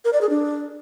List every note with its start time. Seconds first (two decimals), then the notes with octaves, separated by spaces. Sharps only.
0.05 A#4
0.13 D5
0.21 G#4
0.30 D4